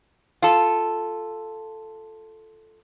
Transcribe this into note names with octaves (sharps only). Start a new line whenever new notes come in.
F4 A4